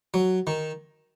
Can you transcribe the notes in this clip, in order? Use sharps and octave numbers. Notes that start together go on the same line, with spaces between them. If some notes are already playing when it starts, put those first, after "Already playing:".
F#3
D#3